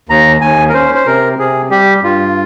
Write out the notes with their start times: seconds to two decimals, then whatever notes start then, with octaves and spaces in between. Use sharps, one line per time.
0.09 D#2 A#5
0.41 D#2 G#5
0.69 A#4
0.74 C#4 C5
0.95 C5
1.06 C3 A#4
1.39 C3 G#4
1.70 G3 G4
2.03 G2 F4